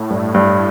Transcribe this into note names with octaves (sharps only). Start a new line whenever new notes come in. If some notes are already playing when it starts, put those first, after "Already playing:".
Already playing: A2
G2
G2